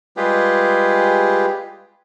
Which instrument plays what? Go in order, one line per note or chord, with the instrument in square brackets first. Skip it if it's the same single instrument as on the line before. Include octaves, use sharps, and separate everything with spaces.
[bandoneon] G3 G#3 F4 G4 G#4 B4